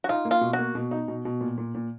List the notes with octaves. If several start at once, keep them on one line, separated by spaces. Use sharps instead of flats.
F#4
D#4 F4
A#3
F4
B2
F#4
A#3
B2
D#4
B2
B2
A#2
A#2
A#2